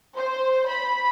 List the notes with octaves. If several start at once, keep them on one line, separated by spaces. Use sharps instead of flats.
C5
B5